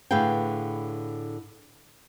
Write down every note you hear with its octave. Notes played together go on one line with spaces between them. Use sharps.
A2 D3 G#4 B4 F5 G5